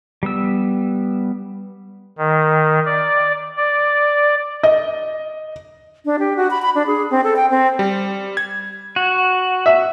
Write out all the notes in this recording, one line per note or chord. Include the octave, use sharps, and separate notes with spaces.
G3 B3 E6
D#3
D5
D5
D#5
D4
G4
F#4
B5
B5
D4
G#4
C4
A4
G5
C4
G3
G#6
F#4
E5